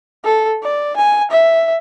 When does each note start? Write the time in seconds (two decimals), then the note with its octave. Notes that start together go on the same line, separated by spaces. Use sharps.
0.24 A4
0.63 D5
0.97 G#5
1.31 E5